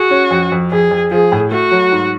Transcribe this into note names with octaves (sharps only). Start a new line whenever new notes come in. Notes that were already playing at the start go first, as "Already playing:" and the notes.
Already playing: F#4 G#4
C#4
F2
F2
F2 G#4
F2
F3 G#4
A2
A3 F#4
F#3
G#2